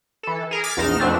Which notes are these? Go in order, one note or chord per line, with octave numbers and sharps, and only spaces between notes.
E3 A4
G#4 A#4
D6 F6 G#6 A6 B6
A#1 E2 D#4 F6 E7
F2 B2 F3 A3 C4 D4